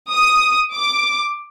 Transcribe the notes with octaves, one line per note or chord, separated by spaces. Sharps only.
D#6
D6